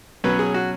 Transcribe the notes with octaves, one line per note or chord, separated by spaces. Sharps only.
B2 F#3 C#4 B4
G#4
F#4